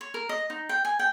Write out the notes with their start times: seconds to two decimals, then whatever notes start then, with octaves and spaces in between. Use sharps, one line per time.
0.01 C#5
0.14 A#4
0.29 D#5
0.50 D#4
0.69 G5
0.85 G#5
0.99 G5